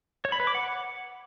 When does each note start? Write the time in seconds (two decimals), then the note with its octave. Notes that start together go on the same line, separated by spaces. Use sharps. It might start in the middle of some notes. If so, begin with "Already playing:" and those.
0.25 C#5
0.32 B5
0.40 B4
0.47 D6
0.55 F#5